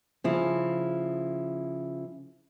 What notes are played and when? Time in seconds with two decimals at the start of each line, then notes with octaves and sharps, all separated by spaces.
0.24 C#3 F3 E4